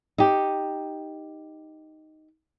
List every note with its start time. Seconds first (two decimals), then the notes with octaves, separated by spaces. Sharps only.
0.18 D#4 G4